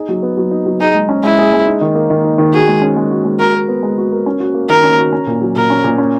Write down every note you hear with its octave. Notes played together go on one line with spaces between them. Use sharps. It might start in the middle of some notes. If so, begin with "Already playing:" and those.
Already playing: D#4 G#4
F#3
B3
F#3
D#4
F#3
D#4 G#4
G#3
C#4
G#3 E4
G#4
G#3
D#4
D#3
A#3
D#3
D#4
D#3
F#4 G#4
G#3
C#4
G#3
F#4
G#3
F#4 A#4
A#4
B3
G#3
F#4
A#4
C#4
F#4
A#3
D#3 A#4
C#4
F#4
C#4
A#2
F#3
A#2 A#4
C#4
A#2
C#4